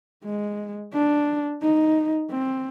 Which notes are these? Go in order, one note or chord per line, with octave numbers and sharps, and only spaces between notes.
G#3
D4
D#4
C4